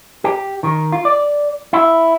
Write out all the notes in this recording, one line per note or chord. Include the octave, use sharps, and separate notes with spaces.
G4
D#3
F4
D5
E4